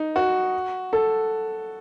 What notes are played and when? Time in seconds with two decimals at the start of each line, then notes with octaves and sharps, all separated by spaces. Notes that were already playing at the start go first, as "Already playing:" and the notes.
Already playing: D#4
0.16 F#4
0.93 A4